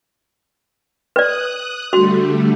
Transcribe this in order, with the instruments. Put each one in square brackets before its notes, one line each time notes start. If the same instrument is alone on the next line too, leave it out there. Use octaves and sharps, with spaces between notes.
[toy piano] B4 D5 [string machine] D#6 F#6
[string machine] D3 G3 A3 [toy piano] F#4 C6